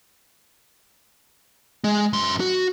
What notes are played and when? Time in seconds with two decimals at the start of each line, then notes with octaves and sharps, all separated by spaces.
1.84 G#3
2.13 F#2 C6
2.40 F#4